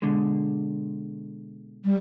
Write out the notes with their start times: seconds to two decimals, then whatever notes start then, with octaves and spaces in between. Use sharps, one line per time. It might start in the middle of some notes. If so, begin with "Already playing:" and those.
0.02 B2 D3 G#3
1.85 G3